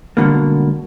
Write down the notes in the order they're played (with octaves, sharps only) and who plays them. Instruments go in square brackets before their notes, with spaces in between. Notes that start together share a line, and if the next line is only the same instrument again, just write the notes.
[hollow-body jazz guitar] C#2 F#2 B2 D3 G3 A#3